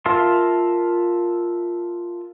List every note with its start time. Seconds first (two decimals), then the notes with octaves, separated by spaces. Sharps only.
0.06 F4 A#4 E5 A5 C6